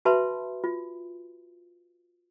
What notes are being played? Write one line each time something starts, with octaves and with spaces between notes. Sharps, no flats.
F#4 B4 E5 A5 B5 C6
F4